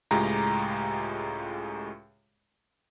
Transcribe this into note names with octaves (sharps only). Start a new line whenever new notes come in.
C#2 A2 G#3 F4 G4 A#5